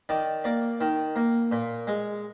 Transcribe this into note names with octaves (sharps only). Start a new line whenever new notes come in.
D#3 D5
A#3 D5
D#3
A#3
A#2
G#3